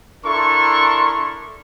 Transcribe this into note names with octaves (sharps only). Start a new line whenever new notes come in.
D4 E4 A4 A#4 C6 C#6